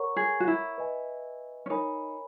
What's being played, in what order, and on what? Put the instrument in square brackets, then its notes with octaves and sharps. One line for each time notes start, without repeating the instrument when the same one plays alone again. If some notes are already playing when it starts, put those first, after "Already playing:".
Already playing: [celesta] A#4 C#5 F#5 A#5 C#6
[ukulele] G#4
F#4
E4
[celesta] B4 D#5 G#5
[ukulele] C#4
[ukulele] D#4 [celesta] A#4 C#5 G#5 B5